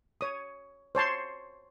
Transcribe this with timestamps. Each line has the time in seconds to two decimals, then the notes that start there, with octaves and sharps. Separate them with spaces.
0.21 C#5 D#6
0.95 C5 C#5 A5 C6